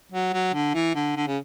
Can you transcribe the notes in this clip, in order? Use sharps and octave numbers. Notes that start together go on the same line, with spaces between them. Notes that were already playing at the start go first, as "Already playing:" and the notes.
F#3
F#3
D3
E3
D3
D3
C#3